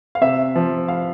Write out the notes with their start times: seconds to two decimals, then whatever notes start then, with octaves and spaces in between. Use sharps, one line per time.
0.15 F5
0.21 C3 E5
0.55 F3
0.88 F5